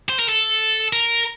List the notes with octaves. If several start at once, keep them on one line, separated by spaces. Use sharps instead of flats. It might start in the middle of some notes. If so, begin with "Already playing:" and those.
C5
A#4
A4
A#4